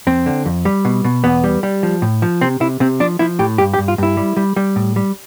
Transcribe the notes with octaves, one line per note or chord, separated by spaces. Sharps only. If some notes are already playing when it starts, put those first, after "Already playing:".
F2 C4
D3
F2
G3
B2
B2
E2 B3
G3
G3
F3
A2
F3
C3 C4
C3 E4
C3 C4
F3 D4
F3 E4
A2 G4
G2 G4
G4
G2
F4
G2 E4
G3
G3
G3
A2
G3